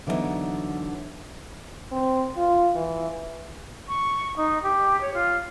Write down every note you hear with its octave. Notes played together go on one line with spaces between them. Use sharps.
D3 E3 F#3 G3 B3 D#4
C4
F4
E3
C#6
D#4
G4
C#5
F4